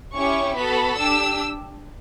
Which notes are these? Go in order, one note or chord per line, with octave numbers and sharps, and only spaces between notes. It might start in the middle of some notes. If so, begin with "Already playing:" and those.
C#4 E4 G4 C#6
B3 F#4 A4 B5
D4 G4 E6